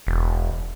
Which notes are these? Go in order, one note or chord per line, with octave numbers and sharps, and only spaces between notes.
E1